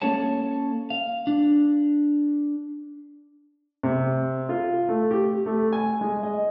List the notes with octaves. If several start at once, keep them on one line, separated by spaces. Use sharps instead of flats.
A#3 C#4 A4 C#5 A5
F5
D4
C3
F4
A3
G4
A3
G#5
G#3
D#5